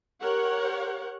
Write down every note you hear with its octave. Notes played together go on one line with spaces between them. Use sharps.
G4 A#4 C#5 F#5